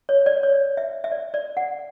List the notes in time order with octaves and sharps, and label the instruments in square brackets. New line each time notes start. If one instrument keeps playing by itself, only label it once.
[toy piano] C#5
D5
C#5
E5
E5
D5
D5
F#5